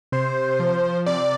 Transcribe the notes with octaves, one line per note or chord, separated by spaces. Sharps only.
C3 C5
F3
C3 D5